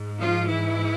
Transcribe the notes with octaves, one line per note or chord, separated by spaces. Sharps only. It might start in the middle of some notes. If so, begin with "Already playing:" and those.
Already playing: G#2
F3 F4
E3 E4